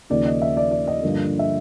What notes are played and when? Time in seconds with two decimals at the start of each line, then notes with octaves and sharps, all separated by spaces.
0.10 D#2 C#3 F3 A#3 D5
0.25 D#5
0.42 E5
0.57 D5
0.71 D5
0.87 D#5
1.03 G2 D3 F3 A#3
1.39 E5